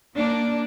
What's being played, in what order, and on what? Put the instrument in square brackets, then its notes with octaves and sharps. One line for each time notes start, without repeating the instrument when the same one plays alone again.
[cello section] A#3 D4